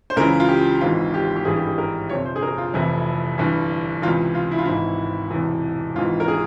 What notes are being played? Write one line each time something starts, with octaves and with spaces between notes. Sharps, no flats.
C5
C#2 C#3 E3 A#4
F4
G4
G#1 G#2 E3 F4
G4
G4
G#1 G2 E3 G#4
G4
G#4
A#4
G1 F2 C3 C#5
C5
G#4
A#4
F4
F1 F2 C3 E3 E4
G1 G2 E3
C#2 C3 E3 F4
F4
E4
F4
G#1 G#2 E3 E4
E1 E2 C3 E3
G#1 G#2 E3 F4
A#4
G#4